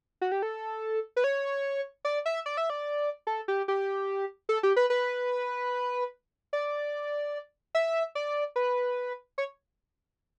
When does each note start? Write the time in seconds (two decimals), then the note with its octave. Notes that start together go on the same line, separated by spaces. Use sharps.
0.21 F#4
0.32 G4
0.42 A4
1.16 B4
1.24 C#5
2.05 D5
2.26 E5
2.46 D5
2.57 E5
2.70 D5
3.27 A4
3.48 G4
3.68 G4
4.49 A4
4.63 G4
4.76 B4
4.90 B4
6.53 D5
7.75 E5
8.15 D5
8.56 B4
9.38 C#5